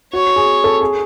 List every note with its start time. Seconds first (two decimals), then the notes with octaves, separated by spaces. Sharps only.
0.13 F#4 C#5
0.36 G#4
0.64 A4
0.81 G#4